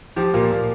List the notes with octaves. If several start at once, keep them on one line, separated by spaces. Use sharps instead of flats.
F3 G4
A#2 F4
A#2